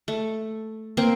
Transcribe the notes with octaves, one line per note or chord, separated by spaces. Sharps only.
A3
A#3 C4